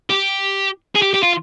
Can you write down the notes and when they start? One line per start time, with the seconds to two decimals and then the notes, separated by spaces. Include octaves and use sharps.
0.10 G4
0.95 G#4
1.02 G4
1.14 G4
1.23 F4